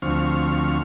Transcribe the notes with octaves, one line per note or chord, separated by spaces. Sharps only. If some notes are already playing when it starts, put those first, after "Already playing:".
D2 F3 C4 C#6 F6